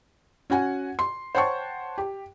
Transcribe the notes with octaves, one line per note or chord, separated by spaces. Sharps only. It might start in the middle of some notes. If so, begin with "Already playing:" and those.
C#4 F#4 F#5 G#5
C6
C5 C#5 F#5 G5 A5 C#6
G4